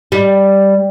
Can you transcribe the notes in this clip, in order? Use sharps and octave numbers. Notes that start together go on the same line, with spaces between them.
G3